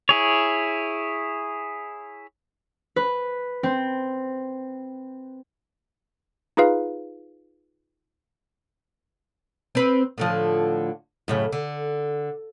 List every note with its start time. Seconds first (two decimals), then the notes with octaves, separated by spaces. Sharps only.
0.09 E4 G#4 C#5
2.96 B4
3.63 C4
6.57 D#4 F4 G#4 B4 F5
9.75 C4 B4
10.18 A2 D3 F3
11.28 F#2 A2 C#3
11.52 D3